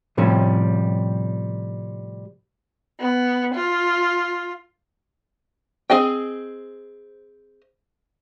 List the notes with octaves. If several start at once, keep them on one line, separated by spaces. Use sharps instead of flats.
A2 C3 F3 G3 C#4
B3
F4
C4 G#4 D#5 G5